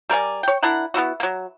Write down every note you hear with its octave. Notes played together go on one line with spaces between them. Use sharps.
G3 A#4 D5 G#5
C#5 G5
D4 E4 A#4 F#5
B3 D#4 E4 F#4
F#3 A#3